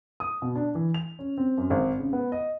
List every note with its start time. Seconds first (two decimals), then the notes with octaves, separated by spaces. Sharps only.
0.20 D#6
0.42 B2
0.55 D4
0.75 E3
0.94 F7
1.19 C#4
1.38 C4
1.58 F#2
1.70 G#1
1.99 C#3
2.13 B3
2.32 D#5